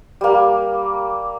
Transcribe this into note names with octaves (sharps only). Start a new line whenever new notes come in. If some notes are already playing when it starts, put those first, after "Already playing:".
G3 A#3